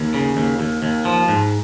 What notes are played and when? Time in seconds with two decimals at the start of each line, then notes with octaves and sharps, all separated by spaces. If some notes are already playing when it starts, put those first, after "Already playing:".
Already playing: D#2
0.14 C#3
0.37 D#2
0.60 D#2
0.83 D#2
1.05 F3
1.29 G#2